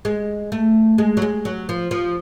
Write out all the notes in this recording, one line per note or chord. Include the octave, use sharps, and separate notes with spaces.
G#3
A3
G#3
F#3
G#3
F#3
F3
F3